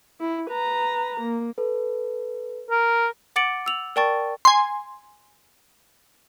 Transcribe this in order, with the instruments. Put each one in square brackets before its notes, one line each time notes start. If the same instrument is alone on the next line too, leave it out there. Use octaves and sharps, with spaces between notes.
[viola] E4
B4 A#5
A#3
[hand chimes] A4 B4
[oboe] A#4
[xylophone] F#5 D6 A6 C#7 D7 F#7
E6 F7 F#7
A#4 D5 G5 A5 C#6 A6
[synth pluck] G#5 C6